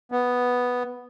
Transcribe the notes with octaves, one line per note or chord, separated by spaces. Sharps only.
B3